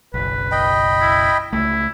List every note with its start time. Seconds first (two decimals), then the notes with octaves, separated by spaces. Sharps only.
0.14 F#1 B1 B4
0.52 D#5 G5 B5
1.01 E4
1.53 C#2 A3 E4